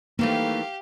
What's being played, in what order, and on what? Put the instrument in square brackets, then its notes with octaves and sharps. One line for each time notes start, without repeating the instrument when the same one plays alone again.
[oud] D#3 E3 A3 [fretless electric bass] A#3 [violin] G4 [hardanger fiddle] F5